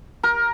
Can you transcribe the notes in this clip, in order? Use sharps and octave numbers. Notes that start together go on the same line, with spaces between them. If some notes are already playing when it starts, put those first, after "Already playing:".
A#4